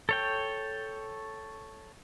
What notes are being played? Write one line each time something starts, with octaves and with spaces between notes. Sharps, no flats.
A4 C#5 G5